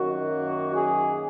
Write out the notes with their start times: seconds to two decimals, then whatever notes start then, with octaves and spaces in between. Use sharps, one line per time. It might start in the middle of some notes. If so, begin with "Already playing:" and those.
Already playing: F#2 D#3 F#3 A#3 F#4
0.73 G#4